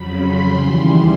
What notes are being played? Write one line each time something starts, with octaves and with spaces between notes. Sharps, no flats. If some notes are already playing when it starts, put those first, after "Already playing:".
Already playing: F2 C#3 F#3 B5
C6
D#2 C#3 E3 G3 C6